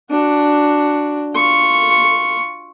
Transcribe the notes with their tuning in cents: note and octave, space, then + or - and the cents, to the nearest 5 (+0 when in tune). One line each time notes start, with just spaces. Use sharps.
D4 +0 F#4 +0
F4 +0 C#6 +0